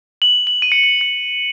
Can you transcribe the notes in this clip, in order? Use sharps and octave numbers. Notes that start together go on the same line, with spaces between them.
F#7
F#7
D#7
C#7
D#7
C#7